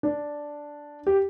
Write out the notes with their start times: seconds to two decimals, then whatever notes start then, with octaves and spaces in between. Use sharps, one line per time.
0.03 D4
1.07 G4